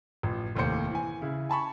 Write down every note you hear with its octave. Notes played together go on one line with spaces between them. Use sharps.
A1 F3
F1 D#2 A2 C5 C#7
E3 G#5
C#3 E4
G#5 A5 B5 C#6